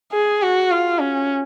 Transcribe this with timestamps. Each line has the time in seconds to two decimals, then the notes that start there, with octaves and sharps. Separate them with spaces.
0.12 G#4
0.42 F#4
0.71 F4
1.00 C#4